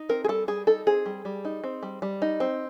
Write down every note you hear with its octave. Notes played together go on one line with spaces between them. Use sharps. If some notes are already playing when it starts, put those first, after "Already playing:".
Already playing: D#4
C4 A#4
G#4
G3 A4
G3 G#4
D#4 A4
C4 G#4
G3
G3
D#4
C4
G3
G3
D#4
C4